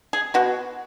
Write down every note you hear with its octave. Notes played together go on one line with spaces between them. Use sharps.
G#4
B2 F#4